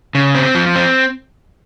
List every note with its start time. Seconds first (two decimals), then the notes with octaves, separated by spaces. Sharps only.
0.15 C#3
0.35 C4
0.55 F3
0.75 C4